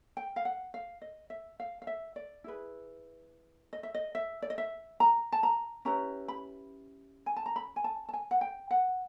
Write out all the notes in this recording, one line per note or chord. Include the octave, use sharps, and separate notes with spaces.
G5
F5
F#5
F5
D#5
E5
F5
F5
E5
D5
E4 G#4 B4
D#5
E5
D#5
E5
D5
D#5
E5
A#5
A5
A#5
C#4 E4 G4 B4 A#5
B5
G#5
A5
A#5
B5
G#5
A5
A5
G#5
F#5
G5
F#5